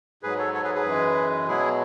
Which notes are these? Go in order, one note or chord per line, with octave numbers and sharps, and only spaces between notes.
G#2 F#3 G#4 B4
A4 C#5
A4 C#5
G#4 B4
G#4 B4
F#2 E3 G#3
B2 F#3 E4 G#4